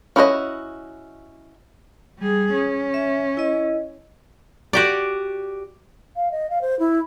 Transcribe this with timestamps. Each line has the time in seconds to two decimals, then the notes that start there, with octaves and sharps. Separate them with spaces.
0.16 C#4 E4 F#4 C5 D#5
2.19 G3 G#4
2.54 C#4
2.94 E5
3.37 E4 D#5
4.73 F#4 G4 D5
6.16 F5
6.32 D#5
6.50 F5
6.62 C5
6.79 E4